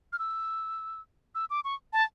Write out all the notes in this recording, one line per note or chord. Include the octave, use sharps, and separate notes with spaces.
F6
E6
E6
D6
C#6
A5